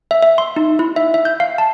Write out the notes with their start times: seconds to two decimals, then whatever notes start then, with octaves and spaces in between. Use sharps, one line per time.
0.11 E5
0.22 E5
0.38 C6
0.56 D#4
0.79 E4
0.96 E5
1.14 E5
1.25 G6
1.40 F5
1.58 A5